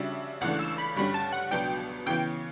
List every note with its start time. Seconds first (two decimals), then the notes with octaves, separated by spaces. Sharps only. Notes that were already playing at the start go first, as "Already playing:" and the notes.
Already playing: C#3 G3 D4 F#4 E5
0.41 C#2 C#3 E3 A3 D4 F#5
0.59 E6
0.78 B5
0.96 G2 D3 G3 C#4 B5
1.14 A5
1.33 F#5
1.51 C#2 B2 F#3 B3 D4 G5
2.06 C#3 E3 B3 G5